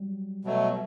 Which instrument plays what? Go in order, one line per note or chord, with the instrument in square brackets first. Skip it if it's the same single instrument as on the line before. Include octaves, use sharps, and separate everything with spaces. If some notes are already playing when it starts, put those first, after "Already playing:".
Already playing: [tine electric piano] F#3 G3
[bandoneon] B2 F#3 A3